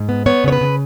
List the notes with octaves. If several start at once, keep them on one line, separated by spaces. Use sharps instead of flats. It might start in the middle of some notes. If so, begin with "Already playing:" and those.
Already playing: G#2
B3
B3 C#5
C#3 C#5
B4
C#3